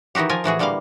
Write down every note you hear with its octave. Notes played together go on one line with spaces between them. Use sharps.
D#3 E3 D#4 F#4 G4
F3 F4 A#4 G#5
A2 E3 F#4 G#4
D3 E3 G3 A#3 F5